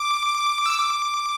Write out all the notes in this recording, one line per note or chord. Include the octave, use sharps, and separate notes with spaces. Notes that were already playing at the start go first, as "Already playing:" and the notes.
Already playing: D6
E6
D6